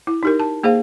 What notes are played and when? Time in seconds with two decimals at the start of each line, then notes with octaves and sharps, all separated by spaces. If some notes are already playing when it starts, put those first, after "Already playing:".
0.07 E4
0.23 D#4 G4 A#4
0.40 A5
0.63 A#3 G#4 C5 F5